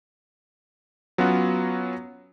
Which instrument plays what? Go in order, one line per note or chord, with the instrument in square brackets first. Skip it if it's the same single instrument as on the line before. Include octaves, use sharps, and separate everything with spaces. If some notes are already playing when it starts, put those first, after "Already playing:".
[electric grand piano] F#3 B3 C#4 F4 F#4